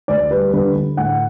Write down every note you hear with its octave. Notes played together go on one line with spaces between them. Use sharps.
D2 D5
G3 B4
D3 B4
D3
A2 F#5